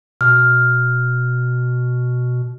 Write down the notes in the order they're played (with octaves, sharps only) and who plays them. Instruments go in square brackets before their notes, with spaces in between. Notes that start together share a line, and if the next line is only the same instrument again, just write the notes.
[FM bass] B2 [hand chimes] F6